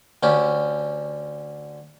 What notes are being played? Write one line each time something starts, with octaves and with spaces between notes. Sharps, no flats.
D2 D3 C#4 G4